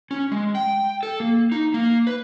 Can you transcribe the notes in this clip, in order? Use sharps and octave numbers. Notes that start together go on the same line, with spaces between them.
C#4
G#3
G5
A4
A#3
D#4
A#3
B4